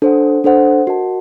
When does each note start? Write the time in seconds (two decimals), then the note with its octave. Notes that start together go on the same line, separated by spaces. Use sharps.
0.02 D4 A4 C5 F#5
0.44 D4 A4 C5 F#5
0.87 F#4 A#4 D#5 F#5 A5